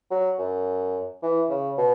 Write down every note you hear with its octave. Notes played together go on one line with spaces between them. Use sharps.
F#3
F#2
E3
C#3
B2